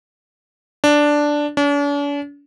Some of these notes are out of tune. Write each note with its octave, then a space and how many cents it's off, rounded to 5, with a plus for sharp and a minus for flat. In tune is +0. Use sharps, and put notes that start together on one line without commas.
D4 +0
D4 -45